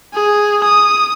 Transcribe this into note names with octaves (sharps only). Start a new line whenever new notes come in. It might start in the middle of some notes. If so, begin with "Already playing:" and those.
G#4
D#6